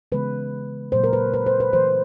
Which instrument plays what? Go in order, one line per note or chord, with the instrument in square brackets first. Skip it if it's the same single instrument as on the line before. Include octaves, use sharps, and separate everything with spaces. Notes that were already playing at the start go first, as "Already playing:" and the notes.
[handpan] C#3 E3 G#3 B3 B4
A#2 F#3 A#3 C5
A#4
B4
B4
C5
B4
E3 A3 C5